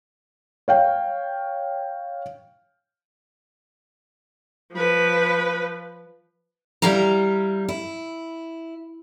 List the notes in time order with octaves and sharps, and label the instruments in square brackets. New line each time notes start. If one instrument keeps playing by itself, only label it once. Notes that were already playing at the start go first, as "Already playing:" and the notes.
[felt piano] C#5 F5 G5
[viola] F3 B4
[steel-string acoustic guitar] G3 E4 G4 F5 A#5
E4